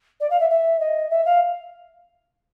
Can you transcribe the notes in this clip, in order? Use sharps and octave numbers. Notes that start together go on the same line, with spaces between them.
D5
F5
E5
E5
D#5
E5
F5